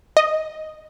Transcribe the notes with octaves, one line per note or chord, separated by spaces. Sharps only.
D#5